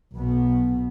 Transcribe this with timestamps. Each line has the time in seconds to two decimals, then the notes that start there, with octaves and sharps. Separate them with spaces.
0.16 B1 B2 B3